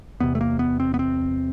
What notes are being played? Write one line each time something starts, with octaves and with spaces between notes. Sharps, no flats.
E2 C3 B3
A3
A#3
B3
C4
B3
C4